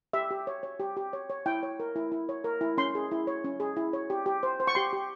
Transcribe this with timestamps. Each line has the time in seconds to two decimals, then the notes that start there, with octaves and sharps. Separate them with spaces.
0.13 G4 E5
0.31 G4
0.47 C#5
0.63 C#5
0.80 G4
0.97 G4
1.13 C#5
1.30 C#5
1.46 E4 G5
1.63 C#5
1.80 A#4
1.96 E4
2.12 E4
2.29 C#5
2.44 A#4
2.61 E4
2.77 C#4 C6
2.95 G#4
3.11 E4
3.27 C#5
3.44 C#4
3.60 G#4
3.77 E4
3.93 C#5
4.10 G4
4.26 G4
4.43 C5
4.60 C5
4.67 C#6
4.75 G4 C6
4.93 G4